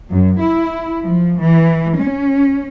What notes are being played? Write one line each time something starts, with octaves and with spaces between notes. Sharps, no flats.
F#2
E4
F3
E3
C#4